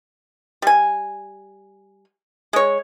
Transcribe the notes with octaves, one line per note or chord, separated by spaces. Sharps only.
G3 G#5
G#3 C#5